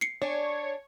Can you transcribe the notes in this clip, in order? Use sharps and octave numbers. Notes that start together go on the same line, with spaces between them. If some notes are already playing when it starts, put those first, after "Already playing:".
C7 C#7
D4 C#5 G#5